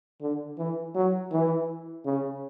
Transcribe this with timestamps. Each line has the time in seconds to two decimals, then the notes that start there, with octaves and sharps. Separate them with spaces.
0.21 D3
0.58 E3
0.95 F#3
1.32 E3
2.05 C#3